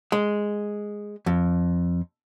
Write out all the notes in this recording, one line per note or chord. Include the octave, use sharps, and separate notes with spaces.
G#3
F2